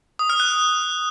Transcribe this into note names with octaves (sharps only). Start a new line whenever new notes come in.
D#6
F6
F#6